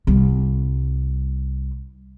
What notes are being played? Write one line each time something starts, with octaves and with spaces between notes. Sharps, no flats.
C2 G3